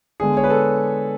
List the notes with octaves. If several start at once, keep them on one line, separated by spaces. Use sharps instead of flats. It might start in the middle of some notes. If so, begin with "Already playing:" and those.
D3 G#3 B3 G#4
C#5
B4
A4